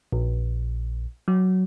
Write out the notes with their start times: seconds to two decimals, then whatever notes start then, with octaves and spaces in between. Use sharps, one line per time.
0.12 A#1
1.28 F#3